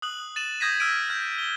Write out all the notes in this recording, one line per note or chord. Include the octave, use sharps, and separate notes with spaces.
D#6 F#6 F#7
A6 D#7 E7 F#7
D#6 G6 G#6 A#6 B6 D#7
E6 F6 G6 A#6 D7 D#7
F6 G6
G7